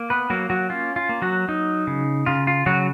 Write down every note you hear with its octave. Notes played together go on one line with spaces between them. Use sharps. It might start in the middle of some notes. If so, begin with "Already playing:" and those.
Already playing: A#3
B3 B4
F#3 A#3 F#4
F#3 F#4
C#4 F4
F4
A#3
F#3 F#4
F#3 D#4
C#3
C#3 F4
F4
C#3 F#3 F#4